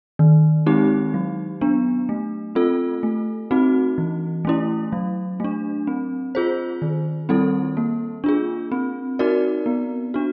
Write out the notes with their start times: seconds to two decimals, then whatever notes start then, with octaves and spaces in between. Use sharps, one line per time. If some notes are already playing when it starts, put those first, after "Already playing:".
0.19 D#3
0.66 G#3 C4 D#4 G4
1.14 F#3
1.61 B3 D4
2.09 A3
2.55 C4 F4 A4
3.03 A3
3.51 C4 D#4 F#4
3.98 E3
4.45 A3 C#4 E4
4.93 F#3
5.40 A3 D4
5.87 C4
6.35 F4 G#4 C5
6.82 D#3
7.29 G3 C4 E4 A4
7.77 A#3
8.24 D4 F4 G#4
8.72 C4
9.19 D#4 F#4 A#4 D5
9.66 B3
10.14 D4 F#4